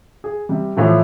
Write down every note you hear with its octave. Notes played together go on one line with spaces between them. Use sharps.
G#4
C3 G3
A2 E3 F3